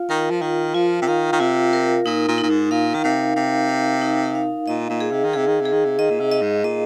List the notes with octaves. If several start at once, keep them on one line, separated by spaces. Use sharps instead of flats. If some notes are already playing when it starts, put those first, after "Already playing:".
Already playing: F4 F5
D#3 A#4
F3
D#3 F4
F3 F4
C3
D#3 F5
D#3
C3 F4
A#4
A#2 D#4
A#2
A#2 D#4
G#2
A#2 F5
D#3
C3 F5
C3 F5
F5
D#4
F5
A#2 D#5
A#2
G#4
C3
D#3
C3 G#4
D#3
C3 G#4
D#3
C3
D#3 D#5
A#2
C3
D#5
G#2
A#2 D#5